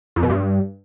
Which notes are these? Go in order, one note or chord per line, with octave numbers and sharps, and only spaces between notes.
F2
B2
G2